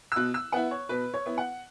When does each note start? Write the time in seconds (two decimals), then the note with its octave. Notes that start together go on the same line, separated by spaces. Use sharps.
0.12 E6
0.16 B2 F#6
0.34 E6
0.52 B3 E4 F#5
0.71 C#5
0.89 B2 B4
1.14 C#5
1.26 B3 E4
1.38 F#5